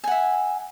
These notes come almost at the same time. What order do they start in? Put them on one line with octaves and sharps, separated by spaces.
G#5 F#5 E5